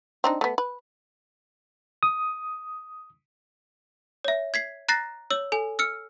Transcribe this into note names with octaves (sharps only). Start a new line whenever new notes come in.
C4 D4 D#4
A3 B3
B4
D#6
C#5 E5
G#6 B6 C7
A#5 F#6 A6 A#6 C7
C#5 E6 F#7
A4 G#5
E6 F6 C#7